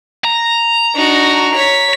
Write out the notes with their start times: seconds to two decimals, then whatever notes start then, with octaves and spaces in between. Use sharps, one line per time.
0.25 A#5
0.95 D4 D#4 F#4
1.55 C#5 B6